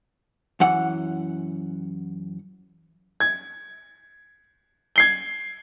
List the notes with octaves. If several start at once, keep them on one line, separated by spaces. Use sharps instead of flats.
F#2 E3 F#5
G#6
G#6 C7 G7